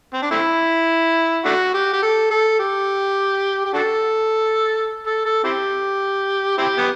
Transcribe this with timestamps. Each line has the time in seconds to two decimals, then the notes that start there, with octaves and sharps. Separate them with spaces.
0.14 C4
0.22 D4
0.31 A3 C4 E4
1.45 A3 D4 F#4
1.74 G4
1.93 G4
2.02 A4
2.31 A4
2.59 G4
3.65 G4
3.74 D4 F#4 A4
5.06 A4
5.25 A4
5.44 C4 E4 G4
6.58 C4 E4 G4
6.78 B3